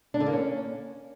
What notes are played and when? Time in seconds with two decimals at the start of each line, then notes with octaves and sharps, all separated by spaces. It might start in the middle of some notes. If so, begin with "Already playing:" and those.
0.14 D4
0.20 D3
0.26 A#3
0.33 C#4